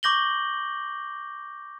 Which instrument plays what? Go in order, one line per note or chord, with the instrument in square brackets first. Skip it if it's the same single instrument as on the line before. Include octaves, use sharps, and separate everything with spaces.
[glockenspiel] C#6 D6 G6 A#6 F#7 G7